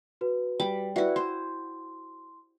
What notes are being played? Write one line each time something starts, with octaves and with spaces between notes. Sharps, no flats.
F#4 B4
G3 B5 D6
E4 F#4 B4 D5 E5
C5 C6